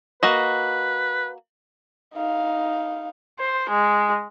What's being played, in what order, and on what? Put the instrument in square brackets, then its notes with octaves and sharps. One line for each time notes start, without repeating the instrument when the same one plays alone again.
[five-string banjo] A#3 F#4 D#5 [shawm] B4
[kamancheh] D#4 F5
C5
G#3